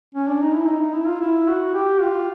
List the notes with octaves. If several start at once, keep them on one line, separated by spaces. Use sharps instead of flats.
C#4
D4
D#4
E4
D#4
D#4
E4
F4
E4
F#4
G4
F4